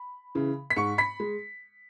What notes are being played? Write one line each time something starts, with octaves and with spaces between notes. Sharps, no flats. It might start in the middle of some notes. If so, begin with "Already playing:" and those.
Already playing: B5
C#3 E3
B6
G#2 C#6 C#7
B5 B6
G#3